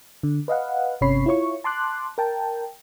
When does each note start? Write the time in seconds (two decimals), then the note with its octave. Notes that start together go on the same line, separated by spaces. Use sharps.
0.23 D3
0.48 B4 D#5 F5 F#5
1.01 G1 C3 C#4 C#5 B5 C7
1.26 E4 F4 C#5 C#6
1.64 A5 C6 D6 F#6
2.18 A#4 G5 A5